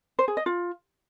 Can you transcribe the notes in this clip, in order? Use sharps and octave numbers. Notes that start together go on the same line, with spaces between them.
C5
G#4
D#5
F4